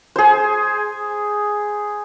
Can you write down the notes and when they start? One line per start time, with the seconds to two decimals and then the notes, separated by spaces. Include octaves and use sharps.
0.16 G#4 C5